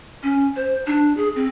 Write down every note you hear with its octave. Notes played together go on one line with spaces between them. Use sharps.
C#4
C5
D4
G#4
C4